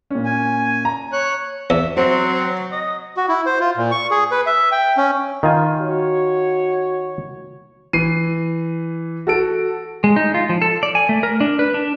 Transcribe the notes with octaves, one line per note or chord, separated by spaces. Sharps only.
A#2 C#4
G#5
A#5
C#5 F#6
E2 E5
F#3 C4 C5
D#5
F#4
E4
C5
F4
A#2
C#6
G#4
B4
E5
G5
C#4
D#3 F4 G#5
F#4 C#5
E3 C7 D#7
F#4 A4 D7
G#3
D#4
F4
F3
A4
D5
G#5
A3
A#4
D4
B4
D4